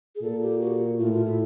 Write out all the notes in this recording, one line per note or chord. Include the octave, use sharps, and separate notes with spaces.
G#4
A#2 A4
G4
F#4
A2 F4
F4
E4